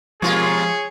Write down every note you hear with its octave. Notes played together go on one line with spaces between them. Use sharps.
B2 F3 G#3 A#3 F4 G#4 C#5